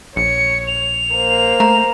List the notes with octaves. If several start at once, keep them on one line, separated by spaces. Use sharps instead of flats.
A#1 C#5 C#7
F7
A#3 C5
A3 A#5